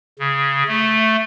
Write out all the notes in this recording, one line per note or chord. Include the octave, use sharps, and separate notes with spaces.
C#3
A3